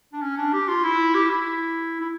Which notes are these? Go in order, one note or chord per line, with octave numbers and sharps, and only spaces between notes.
D4
C#4
D4
G4
F4
E4
G4
E4
E4